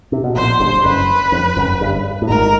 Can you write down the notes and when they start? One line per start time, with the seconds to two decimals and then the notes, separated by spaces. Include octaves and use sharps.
0.12 C3
0.24 B2
0.36 A#1 A#2 C5
0.60 G1 G2
0.84 F#1 F#2 B4
1.32 F2
1.57 F#1 F#2
1.81 G1 G2
2.22 A2
2.29 G#1 G#2 A#4